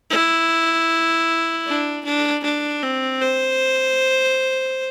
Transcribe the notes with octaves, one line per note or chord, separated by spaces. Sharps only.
E4
D4
D4
D4
C4
C5